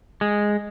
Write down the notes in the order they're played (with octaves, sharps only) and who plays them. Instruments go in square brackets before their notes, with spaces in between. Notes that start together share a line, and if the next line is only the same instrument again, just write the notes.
[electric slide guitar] G#3